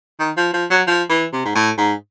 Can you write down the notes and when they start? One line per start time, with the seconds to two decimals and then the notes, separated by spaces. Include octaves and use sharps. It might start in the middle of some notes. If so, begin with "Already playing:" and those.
0.19 D#3
0.37 F3
0.53 F3
0.70 F#3
0.87 F3
1.09 E3
1.32 C3
1.45 G#2
1.55 A2
1.77 G#2